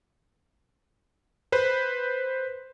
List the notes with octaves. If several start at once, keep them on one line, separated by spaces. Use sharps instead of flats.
B4 C5